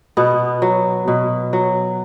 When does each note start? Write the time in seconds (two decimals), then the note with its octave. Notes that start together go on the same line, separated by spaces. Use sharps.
0.17 B2 B3
0.62 F#3
1.08 B2
1.53 F#3